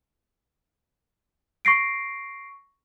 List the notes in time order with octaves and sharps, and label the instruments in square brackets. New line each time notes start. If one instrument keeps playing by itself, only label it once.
[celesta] C#6 A#6 C7 D7